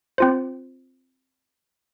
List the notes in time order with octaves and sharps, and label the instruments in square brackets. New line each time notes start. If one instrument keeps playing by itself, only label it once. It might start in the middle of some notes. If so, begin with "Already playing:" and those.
[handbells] C4 F4 C5